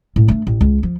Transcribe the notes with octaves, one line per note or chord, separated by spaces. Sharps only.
A2
A3 D4
A1
C#2
F3